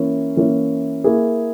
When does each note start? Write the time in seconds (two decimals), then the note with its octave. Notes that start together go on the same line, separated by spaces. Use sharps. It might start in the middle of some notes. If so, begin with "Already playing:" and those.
Already playing: E3 A#3 C#4 E4
0.37 E3 A#3 C#4 E4
1.04 A#3 E4 G#4